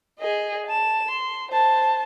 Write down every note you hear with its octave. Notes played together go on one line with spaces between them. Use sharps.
G#4 D#5
A5 E7
C6
C5 A5